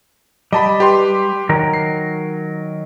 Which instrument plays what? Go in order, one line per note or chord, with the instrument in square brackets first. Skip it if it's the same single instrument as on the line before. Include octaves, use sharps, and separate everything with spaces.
[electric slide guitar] G3 [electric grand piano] D#5 A5 B5
[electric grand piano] G4 B4 C6
[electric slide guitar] D#3 F#3 A#4
[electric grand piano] C7